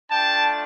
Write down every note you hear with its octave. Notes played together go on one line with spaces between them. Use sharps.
A3 D4 F4 G5 A5